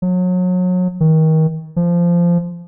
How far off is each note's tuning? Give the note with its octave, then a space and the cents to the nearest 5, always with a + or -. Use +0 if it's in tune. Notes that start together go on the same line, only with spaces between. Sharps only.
F#3 -30
D#3 +30
F3 -15